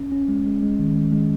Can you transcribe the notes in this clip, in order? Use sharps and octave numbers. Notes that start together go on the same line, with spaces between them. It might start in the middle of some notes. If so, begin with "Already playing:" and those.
Already playing: C#4
C#4
G#3
G#3
G#3
D#3
G#3
G#3